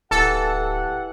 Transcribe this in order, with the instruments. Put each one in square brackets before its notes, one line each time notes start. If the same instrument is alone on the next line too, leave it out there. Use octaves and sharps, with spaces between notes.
[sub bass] D1 [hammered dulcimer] E3 [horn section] G4 F#5 [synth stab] A4